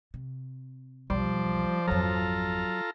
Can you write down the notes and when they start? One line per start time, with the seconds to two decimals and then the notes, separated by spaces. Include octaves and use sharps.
0.14 C3
1.10 B1 E2 F3 G3 C5 D5
1.87 G#1 F2 F#3 F4 A4 A#5